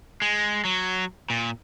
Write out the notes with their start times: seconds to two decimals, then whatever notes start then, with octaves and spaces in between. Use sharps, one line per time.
0.22 G#3
0.65 F#3
1.30 A#2